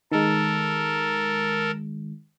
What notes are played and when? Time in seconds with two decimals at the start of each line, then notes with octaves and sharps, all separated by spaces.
0.12 D#3 G#3 A4 A#4